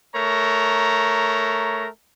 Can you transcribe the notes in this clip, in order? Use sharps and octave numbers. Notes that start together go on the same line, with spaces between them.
A3 A#4 C#5 A#5